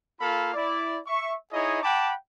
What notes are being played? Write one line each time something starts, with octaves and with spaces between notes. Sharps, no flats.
A#3 F4 A4 F5 B5
E4 D5
E5 C#6
D#4 E4 G#4 C#5 D#5
F#5 G5 A5 B5 D6